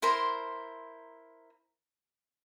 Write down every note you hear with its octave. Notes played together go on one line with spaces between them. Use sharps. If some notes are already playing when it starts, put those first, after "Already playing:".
E4 A#4 C5 C6